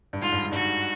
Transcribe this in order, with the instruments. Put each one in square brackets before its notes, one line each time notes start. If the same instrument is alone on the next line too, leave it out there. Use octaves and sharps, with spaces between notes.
[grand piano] G2
[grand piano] G#2 [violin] F4
[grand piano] G2
G#2
[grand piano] G2 [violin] F#4
[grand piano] G#2